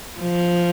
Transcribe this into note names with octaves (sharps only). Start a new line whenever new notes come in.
F3